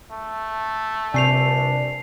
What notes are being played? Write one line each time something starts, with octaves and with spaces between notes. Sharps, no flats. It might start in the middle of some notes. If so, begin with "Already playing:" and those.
A3
A#1 G2 C3 D4 G#5 C7 F7